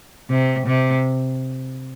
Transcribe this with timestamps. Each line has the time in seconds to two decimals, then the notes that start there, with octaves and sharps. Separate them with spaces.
0.30 C3
0.67 C3